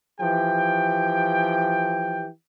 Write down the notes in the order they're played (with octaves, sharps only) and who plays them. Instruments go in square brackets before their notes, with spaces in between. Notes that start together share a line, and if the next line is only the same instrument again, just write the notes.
[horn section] E3 F3 G4 G5